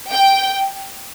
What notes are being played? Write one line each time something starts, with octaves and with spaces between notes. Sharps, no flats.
G5